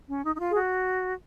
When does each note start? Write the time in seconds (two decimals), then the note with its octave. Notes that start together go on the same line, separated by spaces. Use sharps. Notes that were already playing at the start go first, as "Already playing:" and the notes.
0.10 C#4
0.25 D#4
0.35 D#4
0.40 F4
0.49 G#4
0.56 F#4